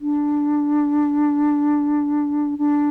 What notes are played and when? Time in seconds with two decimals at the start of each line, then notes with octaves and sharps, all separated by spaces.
0.01 D4
2.59 D4